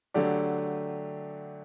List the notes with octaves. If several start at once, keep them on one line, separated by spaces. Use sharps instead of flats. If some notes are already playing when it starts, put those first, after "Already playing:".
D3 F#3 A3 D4 G4